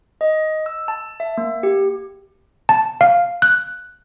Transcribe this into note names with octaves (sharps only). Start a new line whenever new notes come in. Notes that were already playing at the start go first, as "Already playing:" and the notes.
D#5
E6
A5
E5
A#3
G4
A5
F5
F#6